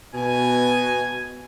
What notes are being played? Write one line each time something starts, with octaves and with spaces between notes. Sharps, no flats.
B2 G#5